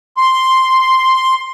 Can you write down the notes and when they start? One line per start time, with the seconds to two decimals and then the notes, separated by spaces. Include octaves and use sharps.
0.17 C6